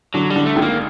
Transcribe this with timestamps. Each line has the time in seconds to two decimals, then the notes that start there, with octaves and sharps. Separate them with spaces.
0.14 D3 F#3
0.30 G3
0.36 D3
0.45 A3
0.56 G#1
0.62 A#3